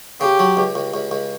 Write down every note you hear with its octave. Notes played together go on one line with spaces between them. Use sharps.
C#3 G4
F#3
C#2
C#2
C#2
C#2